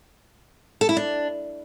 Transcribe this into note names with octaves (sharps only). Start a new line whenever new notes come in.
A4
E4
D4